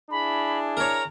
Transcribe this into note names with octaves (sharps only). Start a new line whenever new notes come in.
D4 E4 G#4 B5
A#4 C#5 A#5